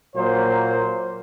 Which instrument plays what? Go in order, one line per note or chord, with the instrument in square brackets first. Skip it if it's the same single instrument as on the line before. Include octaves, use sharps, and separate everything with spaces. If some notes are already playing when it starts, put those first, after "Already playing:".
[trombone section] A#2 F#3 A#3 C5